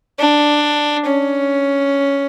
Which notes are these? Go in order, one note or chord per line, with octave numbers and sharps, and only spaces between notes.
D4
C#4